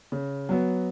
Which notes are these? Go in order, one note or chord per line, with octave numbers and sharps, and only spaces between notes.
C#3
F#3 B3